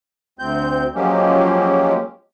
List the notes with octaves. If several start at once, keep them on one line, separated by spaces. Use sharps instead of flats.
D2 C4 G6
F3 F#3 G#3 A#3 C#4 G4